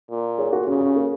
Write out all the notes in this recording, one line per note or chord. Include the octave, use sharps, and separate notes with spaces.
A#2
G#4 C#5
F#4 A#4
C#3 C#4 F#4
C#4
A#3